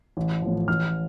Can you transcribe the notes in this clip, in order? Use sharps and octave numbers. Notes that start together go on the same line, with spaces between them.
A1
A2 F3
A1 F6